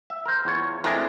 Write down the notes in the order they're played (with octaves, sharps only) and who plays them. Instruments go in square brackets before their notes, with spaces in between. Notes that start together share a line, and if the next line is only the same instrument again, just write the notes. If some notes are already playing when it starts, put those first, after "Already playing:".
[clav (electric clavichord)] E5
A#4 C5
E2 F4 C#5
[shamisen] E3 A3 C4 [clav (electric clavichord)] G#3 D4 A#4